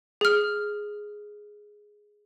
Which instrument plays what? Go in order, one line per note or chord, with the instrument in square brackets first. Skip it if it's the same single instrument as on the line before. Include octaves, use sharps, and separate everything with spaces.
[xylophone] G#4 F6